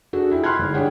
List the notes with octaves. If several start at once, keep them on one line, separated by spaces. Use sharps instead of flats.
D4 F#4 G#4 A4
E4 F4 G#4 G5
B5 C6 F6 F#6 G#6
G1 G#2
D4 G4 G#4 C#5 F#5 G5